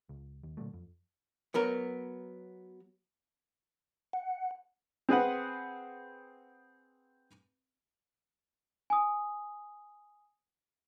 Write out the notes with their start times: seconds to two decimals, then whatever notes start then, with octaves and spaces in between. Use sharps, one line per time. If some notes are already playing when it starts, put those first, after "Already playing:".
0.09 C#2
0.44 D#2
0.57 A#2 D3 F#3 A3
0.74 F2
1.54 F#3 B3 A#4
4.13 F#5
5.09 C4 G#4 B4 F#5
8.90 G#5 D#6